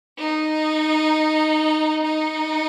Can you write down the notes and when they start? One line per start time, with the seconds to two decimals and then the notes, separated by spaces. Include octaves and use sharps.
0.18 D#4
2.03 D#4